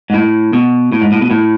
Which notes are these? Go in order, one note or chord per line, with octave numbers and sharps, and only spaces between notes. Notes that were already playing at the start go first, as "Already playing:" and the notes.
G#2
A2
B2
A2
G#2
A2
B2
A2